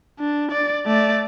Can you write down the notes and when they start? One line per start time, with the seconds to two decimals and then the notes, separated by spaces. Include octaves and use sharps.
0.19 D4
0.51 D5
0.86 A3 D5